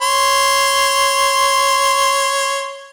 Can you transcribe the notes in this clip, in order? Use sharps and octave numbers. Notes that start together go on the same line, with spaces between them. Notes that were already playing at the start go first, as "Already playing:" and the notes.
C#5 C6